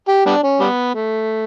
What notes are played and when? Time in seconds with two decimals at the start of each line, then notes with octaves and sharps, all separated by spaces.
0.08 G4
0.26 G3 B3 D4
0.43 C#4
0.60 G3 B3
0.94 A3